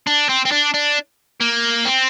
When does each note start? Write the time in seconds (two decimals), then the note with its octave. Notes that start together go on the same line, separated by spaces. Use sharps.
0.07 D4
0.29 C4
0.45 C4
0.52 D4
0.74 D4
1.40 A#3
1.85 C4